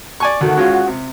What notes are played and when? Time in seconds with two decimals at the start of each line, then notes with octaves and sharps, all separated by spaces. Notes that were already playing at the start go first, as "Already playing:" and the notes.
0.20 D5 G#5 C#6
0.41 D2 D#3 A3 F#4
0.57 G#3 C#4 F4
0.87 C3